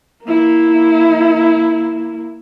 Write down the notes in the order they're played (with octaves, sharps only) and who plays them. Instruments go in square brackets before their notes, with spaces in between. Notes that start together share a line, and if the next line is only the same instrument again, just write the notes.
[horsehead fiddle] A#3 E4